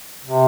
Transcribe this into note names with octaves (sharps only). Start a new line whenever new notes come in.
C3